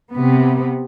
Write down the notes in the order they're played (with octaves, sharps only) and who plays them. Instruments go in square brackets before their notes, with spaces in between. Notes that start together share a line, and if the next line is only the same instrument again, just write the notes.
[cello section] C3 B3